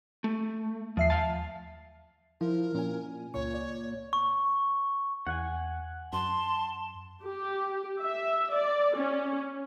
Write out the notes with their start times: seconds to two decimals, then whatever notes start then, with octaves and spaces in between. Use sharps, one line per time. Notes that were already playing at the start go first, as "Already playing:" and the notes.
0.24 A3
0.97 D#2 F3 E5 C7
1.10 F5 A5
2.41 F3 E4 A#4
2.75 A#2 C#4 G#5
3.34 C#2 A#2 C#5 C#6
3.54 D5
4.13 C#6
5.27 E2 F#5 G#5
6.13 F#2 A5 C6
7.23 G4
8.02 E5
8.55 D5
8.97 C#4